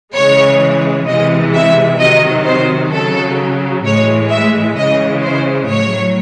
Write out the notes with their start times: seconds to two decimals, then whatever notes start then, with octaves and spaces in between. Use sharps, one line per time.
0.15 C#3 E3 G#3 C#5
1.07 C3 E3 G#3 D#5
1.54 E5
2.00 C3 D#3 F#3 D#5
2.46 C5
2.92 C#3 F#3 A4
3.85 A2 E3 G#3 C#5
4.31 E5
4.77 C#3 E3 G#3 D#5
5.24 C5
5.69 A2 F#3 C#5